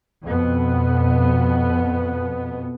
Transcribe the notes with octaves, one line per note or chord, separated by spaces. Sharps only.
F2 B2 B3